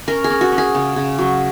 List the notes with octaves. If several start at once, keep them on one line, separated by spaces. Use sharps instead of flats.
C#4 A#4
G#4
C#4
F#4
C#4
G#4
C#3
C#3
F#3